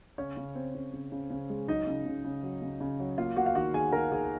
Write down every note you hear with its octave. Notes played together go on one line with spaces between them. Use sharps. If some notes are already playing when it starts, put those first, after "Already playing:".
C#3 C#4 C#5
C#3
C4
C#3
C#3
C#3
C#3
G#3
F#3 D#4 D#5
C#3
C#3
C#3
F#3
C#3
C#3
F#3
A#3 F4 F5
A#3 F#4 F#5
F5
D#3 F#4 F#5
D#3 G#4 G#5
D#3 A#4 A#5
D#3 G#4 G#5